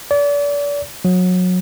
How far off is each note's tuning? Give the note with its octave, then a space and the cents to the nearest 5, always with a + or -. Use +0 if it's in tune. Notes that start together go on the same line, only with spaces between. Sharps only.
D5 -35
F#3 -25